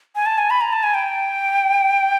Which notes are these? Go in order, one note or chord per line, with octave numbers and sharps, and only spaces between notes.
G#5
A5
G#5
B5
A#5
A5
G#5
G5